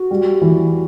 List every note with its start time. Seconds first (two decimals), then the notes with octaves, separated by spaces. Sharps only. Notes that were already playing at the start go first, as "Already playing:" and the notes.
Already playing: F#4
0.11 G3
0.41 E3